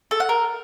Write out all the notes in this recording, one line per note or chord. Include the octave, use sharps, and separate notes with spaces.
A4
F#5
A#4